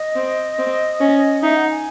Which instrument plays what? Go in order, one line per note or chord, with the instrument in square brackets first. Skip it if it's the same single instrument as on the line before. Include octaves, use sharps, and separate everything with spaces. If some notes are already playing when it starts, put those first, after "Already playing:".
Already playing: [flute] D#5
[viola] C4
C4
C#4
[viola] D#4 [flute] E5
[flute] F#5
G#5